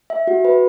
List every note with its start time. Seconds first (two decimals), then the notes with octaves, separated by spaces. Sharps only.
0.10 E5
0.27 F#4
0.45 B4